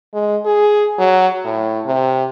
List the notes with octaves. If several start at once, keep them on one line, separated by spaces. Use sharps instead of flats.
G#3
G#4
F#3
A2
C3